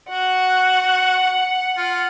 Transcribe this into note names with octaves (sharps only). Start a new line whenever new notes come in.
F#4 F#5
F4